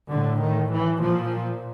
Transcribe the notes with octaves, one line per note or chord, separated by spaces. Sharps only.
A2 D3
D#3
E3
A#2 F3